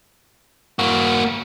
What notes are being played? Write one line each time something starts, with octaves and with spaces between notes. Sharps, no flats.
A#3 F#4